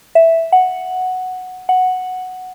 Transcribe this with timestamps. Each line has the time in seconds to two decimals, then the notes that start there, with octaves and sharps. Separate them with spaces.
0.15 E5
0.52 F#5
1.69 F#5